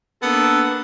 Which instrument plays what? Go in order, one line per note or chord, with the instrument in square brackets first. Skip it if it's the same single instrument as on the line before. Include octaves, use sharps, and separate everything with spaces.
[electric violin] A#3 D4 [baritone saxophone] B3 [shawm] A4